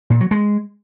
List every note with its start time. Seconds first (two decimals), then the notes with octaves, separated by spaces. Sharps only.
0.10 A#2
0.21 F#3
0.31 G#3